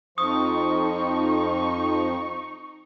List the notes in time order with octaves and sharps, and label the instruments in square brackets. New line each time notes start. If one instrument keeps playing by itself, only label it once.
[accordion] F2 F3 [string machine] D#4 [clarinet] C#6 [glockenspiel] D#6